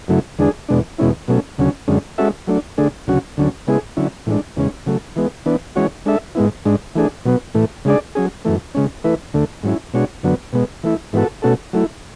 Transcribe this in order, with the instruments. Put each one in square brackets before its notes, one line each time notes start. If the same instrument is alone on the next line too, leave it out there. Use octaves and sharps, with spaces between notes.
[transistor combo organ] F#2 C#3 F#3 A3 E4
E2 D3 G#3 D4 G#4
E2 B2 G#3 D4
E2 B2 G#3 C#4 E4
B2 F#3 A3 C#4
D2 C#3 F#3 C#4
F#2 D3 G#3 C#4
G#3 C#4 F#4 A4 E5
F#3 A3 D4
D3 A3 D4 G#4
D2 C#3 F#3 C#4 F#4
D2 D3 F#3 C#4
C#3 G#3 B3 E4 G#4
D3 F#3 C#4 E4
A2 E3 G#3 D4
E2 C#3 G#3 C#4
C#3 F#3 A3
E3 G#3 B3
E3 B3 D4
E3 G#3 C#4 F#4 C#5
G#3 D4 A4 E5
G#2 G#3 B3 E4
G#2 G#3 D4
E3 A3 D4 G#4
B2 F#3 B3
A2 E3 A3
C#3 G#3 D4 G#4 D5
F#3 C#4 G#4
F#2 E3 A3
C#3 G#3 C#4
E3 A3 E4 B4
D2 D3 A3
G#2 F#3 C#4 E4
B2 G#3 D4 F#4 C#5
F#2 D3 F#3 B3
B2 G#3 B3
E3 A3 E4
G#2 E3 B3 F#4 A4
B2 A3 C#4 F#4 A4
F#3 A3 E4